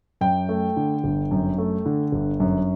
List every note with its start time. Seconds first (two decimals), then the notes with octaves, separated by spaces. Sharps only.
0.21 F#2 G5
0.49 A3
0.77 D3
1.04 G1
1.31 F#2
1.58 A3
1.86 D3
2.12 G1
2.40 F#2